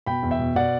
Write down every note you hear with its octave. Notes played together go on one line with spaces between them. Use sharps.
B2 G5 B5
E2
E5 G5
B2
B2 D5 F#5